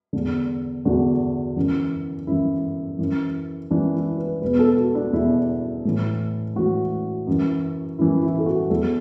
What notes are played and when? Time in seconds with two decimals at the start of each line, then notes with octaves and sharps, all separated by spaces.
0.13 E2 D3
0.85 E2 D3 F#4
1.56 F#2 E3
2.27 F#2 E3 E4
2.99 F#2 E3
3.70 F#2 E3 D4
3.94 E4
4.17 B4
4.42 E2 B2 B4
4.59 A4
4.77 F#4
4.95 D4
5.13 E2 B2 E4
5.85 A2 E3
6.56 A2 E3 F#4
7.27 F#2 E3
7.98 F#2 E3 E4
8.22 E4
8.39 A4
8.46 F#4
8.70 E2 E3 A4